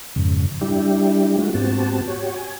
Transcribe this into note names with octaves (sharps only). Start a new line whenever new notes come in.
F2 G#2 C#3
G3 D4 E4 G4
G#3 A3 F4 F#4
G#2 B3 C4 F#4 G4 A5
F#4 G4 C#5
G#5